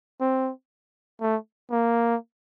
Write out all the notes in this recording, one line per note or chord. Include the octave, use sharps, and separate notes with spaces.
C4
A3
A#3